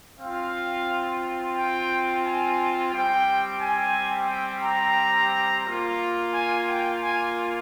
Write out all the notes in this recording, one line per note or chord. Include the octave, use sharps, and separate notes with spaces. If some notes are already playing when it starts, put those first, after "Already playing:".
C4 F4 F5
G5
G#5
G3 C4 G4 G5
G#5
G5
A#5
A#3 F4
G#5
G5
G#5